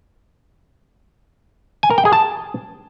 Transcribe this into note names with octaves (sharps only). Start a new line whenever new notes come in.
G#5
A#4
G5
G#4
A5